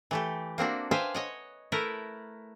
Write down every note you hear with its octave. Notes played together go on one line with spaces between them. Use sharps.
E3 A3 G4
A#3 C4 D4 F#4
B4 C5 E5 F5 G5 G#5
C#5 D#5 F#5
A3 E4 A#4 B4 A#5